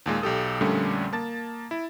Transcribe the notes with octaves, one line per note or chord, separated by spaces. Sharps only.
D#2 A#2 G#3
B1 G4 A4 D#6
F2 A#2 D3 G3 A3 C#4
A#3 A5 A6
E4